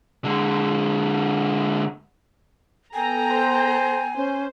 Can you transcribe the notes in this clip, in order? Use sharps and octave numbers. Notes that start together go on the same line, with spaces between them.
D3 G#3
B3 A4 G5 G#5 A#5
C5
C#4 C5